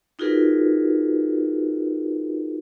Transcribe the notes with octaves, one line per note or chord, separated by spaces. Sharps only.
D#4 F4 F#4 G#4 A#4 B4